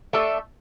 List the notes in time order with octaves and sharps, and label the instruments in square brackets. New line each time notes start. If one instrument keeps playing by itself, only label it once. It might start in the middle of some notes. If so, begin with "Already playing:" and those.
[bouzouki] A3 D4 A4 E5